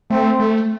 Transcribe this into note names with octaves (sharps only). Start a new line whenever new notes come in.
A3 C4
A3